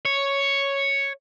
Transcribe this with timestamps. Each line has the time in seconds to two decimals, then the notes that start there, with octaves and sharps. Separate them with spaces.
0.05 C#5